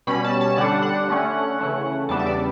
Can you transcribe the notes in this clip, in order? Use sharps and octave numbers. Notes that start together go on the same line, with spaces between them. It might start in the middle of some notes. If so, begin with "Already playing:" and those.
B2 G3 C#4 B5
A5
A5
D3 G3 D4 F#5
F#5
D3 A3 C#4
C#3 E3 A3 C#4
E2 C#3 G3 B3 D4 A5
E5
D5